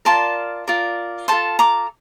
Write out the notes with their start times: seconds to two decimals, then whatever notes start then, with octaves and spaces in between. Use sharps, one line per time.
0.05 F4 A#4 D5 A5 C6
0.67 F4 A#4 D5
1.28 F4 A4 C5 A5 C6
1.59 A#5 D6